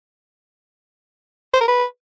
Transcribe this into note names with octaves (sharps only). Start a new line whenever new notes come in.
C5
A#4
B4